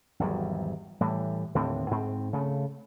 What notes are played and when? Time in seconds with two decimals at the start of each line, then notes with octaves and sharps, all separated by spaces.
0.19 G#1 E2 F#3 G3
1.01 A2 E3 G3
1.55 D#2 A2 D3 C4
1.91 G#2 C4
2.33 C#3 A3